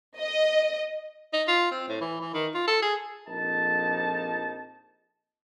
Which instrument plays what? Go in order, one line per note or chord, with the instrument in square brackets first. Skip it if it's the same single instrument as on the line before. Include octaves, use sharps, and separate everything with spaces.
[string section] D#5
[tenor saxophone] D#4
F4
C4
A2
E3
E3
D#3
F4
A4
G#4
[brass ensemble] A#1 F2 D#4 A5